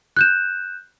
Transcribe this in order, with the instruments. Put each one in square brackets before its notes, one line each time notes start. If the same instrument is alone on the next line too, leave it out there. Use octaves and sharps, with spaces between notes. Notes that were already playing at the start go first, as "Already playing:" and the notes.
[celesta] F#6 G6 E7